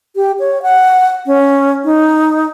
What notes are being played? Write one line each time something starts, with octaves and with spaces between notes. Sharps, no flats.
G4
C#5
F#5
C#4
D#4